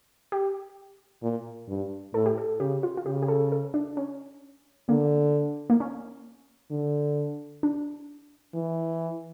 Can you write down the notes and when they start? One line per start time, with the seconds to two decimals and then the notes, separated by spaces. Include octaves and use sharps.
0.32 G4
1.23 A#2
1.68 G2
2.14 A2 A4
2.26 G4
2.38 A4
2.60 C#3 G4
2.83 F4
2.97 F4
3.06 C#3 G4
3.23 G4
3.28 A4
3.52 A4
3.74 D4
3.97 C#4
4.89 D3 A#3
5.70 A#3
5.80 C#4
6.71 D3
7.63 D4
8.54 E3